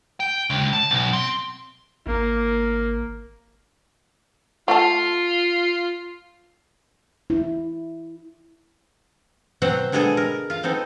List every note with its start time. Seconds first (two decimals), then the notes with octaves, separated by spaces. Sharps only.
0.20 G5
0.50 C#2
0.73 A5
0.90 B1
1.13 C4
2.07 G#1 A#3
4.68 A3 F4 F#5 A5
7.30 E4
9.62 B2 F#3 C4 C5 F#5
9.92 D3 G#3 B3 G#4 A4
10.17 A#4
10.50 F4 F5
10.63 B3 C4 D#4 A4